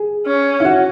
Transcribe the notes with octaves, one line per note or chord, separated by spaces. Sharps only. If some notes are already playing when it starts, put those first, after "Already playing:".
Already playing: G#4
C#4
E4
F#4